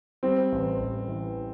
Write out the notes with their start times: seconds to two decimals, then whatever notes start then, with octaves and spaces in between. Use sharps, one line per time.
0.23 G3 C4
0.52 A1
0.80 A1
1.08 E3